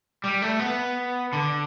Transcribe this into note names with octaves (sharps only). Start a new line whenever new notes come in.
G3
A3
B3
D3